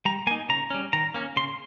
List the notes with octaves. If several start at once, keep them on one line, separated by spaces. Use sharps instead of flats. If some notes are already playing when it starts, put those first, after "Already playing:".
G3 A#5
A#3 D#4 G#5
C#3 A#5
G3 C#4
D#3 A#5
A#3 C#4
C#3 C6